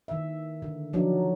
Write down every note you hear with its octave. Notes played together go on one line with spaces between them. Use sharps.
D#3 E5
D3
D3 F3 F#3 D4 D#4